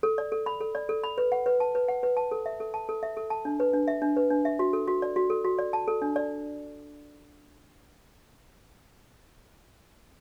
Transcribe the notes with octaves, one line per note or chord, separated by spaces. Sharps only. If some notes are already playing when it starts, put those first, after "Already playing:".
A4
D5
A4
B5
A4
D5
A4
B5
B4
F#5
B4
A5
B4
F#5
B4
A5
A4
E5
A4
A5
A4
E5
A4
A5
D4
B4
D4
E5
D4
B4
D4
E5
F#4
A4
F#4
D5
F#4
A4
F#4
D5
A5
A4
D4
D5